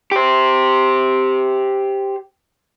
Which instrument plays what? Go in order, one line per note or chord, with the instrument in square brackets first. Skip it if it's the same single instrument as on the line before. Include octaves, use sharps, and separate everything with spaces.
[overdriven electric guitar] G4 C5